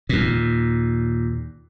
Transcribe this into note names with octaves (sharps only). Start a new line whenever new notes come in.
D#2 A#2